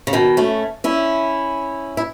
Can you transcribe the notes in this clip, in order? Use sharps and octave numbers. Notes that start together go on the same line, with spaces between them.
C#3
B2 D#3
A3 C#4
C#4 E4
E4